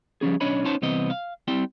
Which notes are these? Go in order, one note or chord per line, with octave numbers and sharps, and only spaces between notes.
F3 G3 C#4 G#4
B1 C#4 D4 C#5 D#5 B5
B3 C#4 D#4 C5 C#5 A5
C2 E3 B3 C4 D#5
F5
G3 C4 E4 G5